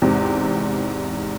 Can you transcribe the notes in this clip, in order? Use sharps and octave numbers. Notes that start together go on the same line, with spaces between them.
E2 G#2 C3 C4